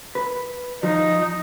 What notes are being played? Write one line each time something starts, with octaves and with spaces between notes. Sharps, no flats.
B4
F3 D#4